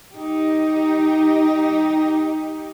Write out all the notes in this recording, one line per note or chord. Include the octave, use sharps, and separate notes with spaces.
D#4 G4